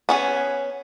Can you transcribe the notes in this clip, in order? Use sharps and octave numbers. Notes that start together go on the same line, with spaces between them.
B3 C#4 G#4